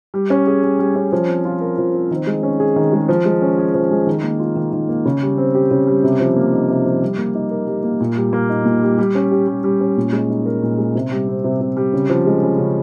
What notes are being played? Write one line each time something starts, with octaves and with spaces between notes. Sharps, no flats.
G3
C#4
G#4
G3
G3
C#4
F3
C4
F4
A#4
F3
C4
D#3
G#3
C#4
G#4
D#3
G#3
F3
G#3
C#4
G#4
F3
G#3
D#3
A#3
F4
D#3
D#3
A#3
C#3
G3
C4
G4
C#3
G3
C3
F3
A#3
D#4
C3
F3
G3
A#3
D#4
A#4
G3
A#3
A#2
G3
A#3
D#4
A#2
G3
G3
C#4
G4
G3
G3
C#4
A#2
G#3
D#4
A#4
A#2
G#3
C3
G3
C4
C3
C3
G3
C#3
F3
G#3
C#4
C#3